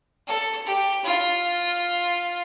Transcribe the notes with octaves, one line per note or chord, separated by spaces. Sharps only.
A4
G4
F4